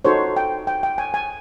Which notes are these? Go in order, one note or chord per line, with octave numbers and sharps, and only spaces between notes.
D#4 F#4 A4 C5 C#5
G5
G5
G5
G#5
G#5